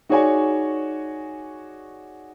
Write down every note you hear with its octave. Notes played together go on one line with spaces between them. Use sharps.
D#4 F#4 G#4 C#5 D5 G#5